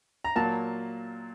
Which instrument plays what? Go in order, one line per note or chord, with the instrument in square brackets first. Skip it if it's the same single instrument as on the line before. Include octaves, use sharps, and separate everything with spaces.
[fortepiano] A#5
A#2 F#3 A#3 A5